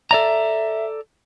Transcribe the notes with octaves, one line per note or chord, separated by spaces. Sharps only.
A4 D5 E5 A#5